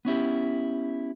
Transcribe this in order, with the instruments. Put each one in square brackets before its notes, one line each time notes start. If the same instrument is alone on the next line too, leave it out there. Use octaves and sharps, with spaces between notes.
[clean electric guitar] B3 C#4 E4 G4